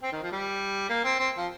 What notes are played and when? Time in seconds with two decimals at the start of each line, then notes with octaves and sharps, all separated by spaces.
0.02 C4
0.12 D#3
0.22 F3
0.31 G3
0.89 A#3
1.04 C4
1.19 C4
1.37 F3